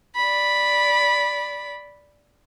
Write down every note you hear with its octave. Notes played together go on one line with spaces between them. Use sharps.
D5 B5